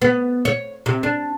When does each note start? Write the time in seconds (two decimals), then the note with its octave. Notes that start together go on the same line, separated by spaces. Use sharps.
0.02 B3
0.45 C#5
0.86 C3
1.03 D4